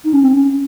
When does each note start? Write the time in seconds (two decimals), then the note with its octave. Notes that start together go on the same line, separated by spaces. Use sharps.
0.05 D#4
0.13 C#4
0.24 C4
0.33 C#4